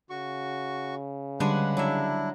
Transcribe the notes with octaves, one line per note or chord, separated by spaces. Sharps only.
C#3 F#4 C#6
D3 G3 G#3 D4 B4 F#5 G#5
F#3 D4 E4 E5